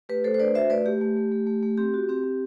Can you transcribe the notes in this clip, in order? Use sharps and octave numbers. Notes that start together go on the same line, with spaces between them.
A3 G4 B4
A3 A4 C5
C5
D4 B4 D5
F#4 C5 E5
A3 B4 D5
A3 G4
A3
A3
A3
A3
A3
C4 G4
F#4
C4 G4
C4